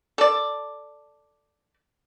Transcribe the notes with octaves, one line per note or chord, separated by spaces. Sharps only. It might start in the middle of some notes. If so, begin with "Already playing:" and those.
A4 D5